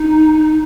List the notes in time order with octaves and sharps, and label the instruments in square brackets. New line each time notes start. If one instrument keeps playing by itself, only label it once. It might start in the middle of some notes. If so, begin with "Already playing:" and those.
Already playing: [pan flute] D#4